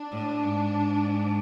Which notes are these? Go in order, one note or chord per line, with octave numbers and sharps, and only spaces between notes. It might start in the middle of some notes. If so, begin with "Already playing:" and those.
Already playing: D4
A2
G#2